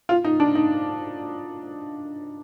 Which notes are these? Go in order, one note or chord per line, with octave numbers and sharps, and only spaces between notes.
F4
D#4
D4
D#4